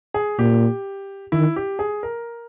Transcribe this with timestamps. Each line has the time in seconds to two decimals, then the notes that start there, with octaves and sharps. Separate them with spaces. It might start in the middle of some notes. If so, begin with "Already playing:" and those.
0.14 G#4
0.39 A#2 G4
1.32 D#3 E4
1.56 G4
1.79 G#4
2.03 A#4